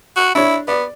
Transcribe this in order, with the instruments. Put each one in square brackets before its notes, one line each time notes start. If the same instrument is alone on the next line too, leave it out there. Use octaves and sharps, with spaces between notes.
[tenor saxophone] F#4
[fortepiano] D4 C#5 [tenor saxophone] E4
[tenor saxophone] B3 [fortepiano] D5